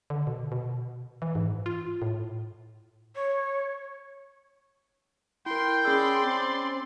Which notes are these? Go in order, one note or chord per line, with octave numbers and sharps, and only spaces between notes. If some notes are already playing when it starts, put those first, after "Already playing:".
D3
B2
B2
E3
G#2
F4
A2
C#5
E4 A#4 G5 C6
C#4 G#4 D5 B5 C6 E6
C4